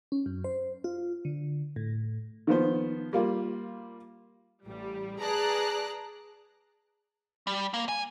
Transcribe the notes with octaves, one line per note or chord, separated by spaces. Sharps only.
C#4
F#2
C5
F4
D3
A2
D#3 F3 B3 C5
G3 A#3 F4
A1 G3
G#4 B4 D5 A5 A#5 F#6
G3
A#3
G#5